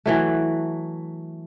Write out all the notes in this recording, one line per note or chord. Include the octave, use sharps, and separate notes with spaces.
E3 F#3 A3